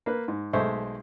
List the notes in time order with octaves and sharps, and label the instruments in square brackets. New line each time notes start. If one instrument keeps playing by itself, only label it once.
[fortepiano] A#3 B4
G#2
B1 G#3 A3 C5 E5 C#6